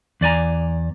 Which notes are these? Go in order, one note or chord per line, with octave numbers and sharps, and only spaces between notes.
E2 D5 G#5 A#5